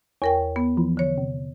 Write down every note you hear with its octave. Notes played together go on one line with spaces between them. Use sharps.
E2 A#4 C#5 G5
B3
E3 F3
D3 C#5
C3